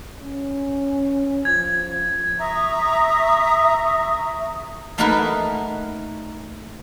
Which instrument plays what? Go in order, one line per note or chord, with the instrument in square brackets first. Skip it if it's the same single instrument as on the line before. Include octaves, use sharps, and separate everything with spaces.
[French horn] C#4
[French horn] F3 [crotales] G#6
[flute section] E5 A#5 C#6 D#6
[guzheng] A3 A#3 D#4 F#4 A#4 B4